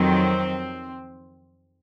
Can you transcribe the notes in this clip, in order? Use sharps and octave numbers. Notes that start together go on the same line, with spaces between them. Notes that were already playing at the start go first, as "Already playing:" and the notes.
Already playing: F2 D#3 F#3 C4